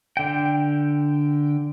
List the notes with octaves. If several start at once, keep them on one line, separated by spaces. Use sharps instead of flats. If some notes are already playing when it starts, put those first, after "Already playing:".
D3 G5